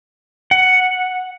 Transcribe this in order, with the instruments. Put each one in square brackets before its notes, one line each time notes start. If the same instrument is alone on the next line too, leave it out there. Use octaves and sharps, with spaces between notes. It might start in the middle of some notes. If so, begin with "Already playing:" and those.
[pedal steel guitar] F#5